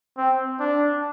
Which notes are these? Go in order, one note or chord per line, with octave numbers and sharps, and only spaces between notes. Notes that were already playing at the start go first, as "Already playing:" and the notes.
C4
D4